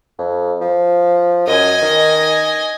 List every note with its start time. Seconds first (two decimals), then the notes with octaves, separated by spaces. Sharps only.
0.19 F2
0.61 F3
1.47 F#2 D#5 G#5
1.82 D#3